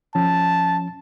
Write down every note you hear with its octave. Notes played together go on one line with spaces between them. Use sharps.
F3 C#4 A5